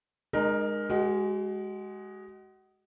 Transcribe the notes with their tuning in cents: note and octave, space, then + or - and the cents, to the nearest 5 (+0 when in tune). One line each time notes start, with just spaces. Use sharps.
G#3 -5 D#4 -35 A#4 +10
G#3 +0 F#4 +35